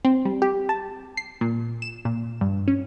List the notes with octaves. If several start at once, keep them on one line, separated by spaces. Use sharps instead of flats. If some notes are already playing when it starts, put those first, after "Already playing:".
C4
G3
G4
A5
C7
A#2
E7
A#2
G2
C#4